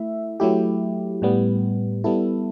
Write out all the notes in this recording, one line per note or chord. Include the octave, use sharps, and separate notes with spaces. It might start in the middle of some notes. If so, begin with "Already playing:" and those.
Already playing: A3 E4 E5
F#3 A3 E4 G4
A2 G3 B3
G3 B3 E4 A4